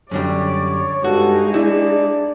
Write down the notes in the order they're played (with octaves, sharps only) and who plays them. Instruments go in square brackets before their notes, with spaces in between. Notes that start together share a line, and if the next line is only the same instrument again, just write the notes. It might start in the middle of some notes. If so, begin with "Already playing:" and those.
[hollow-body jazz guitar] F#2 D3 G3 [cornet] C#5 [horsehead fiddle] D5
[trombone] G2 [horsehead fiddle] G#3 D#4 [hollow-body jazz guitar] F#4 [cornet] A4
[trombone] D4 [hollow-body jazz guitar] E4 [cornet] D5